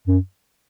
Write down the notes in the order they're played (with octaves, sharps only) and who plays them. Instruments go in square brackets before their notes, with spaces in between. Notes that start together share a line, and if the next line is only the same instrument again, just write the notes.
[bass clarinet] F#2